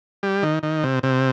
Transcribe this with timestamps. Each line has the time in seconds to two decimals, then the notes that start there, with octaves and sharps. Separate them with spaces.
0.23 G3
0.43 D#3
0.63 D#3
0.83 C3
1.03 C3